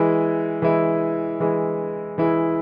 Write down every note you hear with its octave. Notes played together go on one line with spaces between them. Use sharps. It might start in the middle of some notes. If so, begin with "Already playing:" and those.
Already playing: E3 G#3 E4
E3 G#3 E4
E3 G#3 E4
E3 G#3 E4